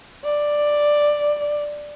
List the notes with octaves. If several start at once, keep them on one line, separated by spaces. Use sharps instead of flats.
D5